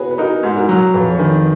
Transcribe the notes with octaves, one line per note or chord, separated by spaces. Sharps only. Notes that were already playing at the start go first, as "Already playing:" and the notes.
Already playing: F#4 G#4 B4 C#5
B4
D#4 F#4 A#4
G#2
F#4 A#4
F#3
F2 G#4 B4
C#5
D#3 G#4 B4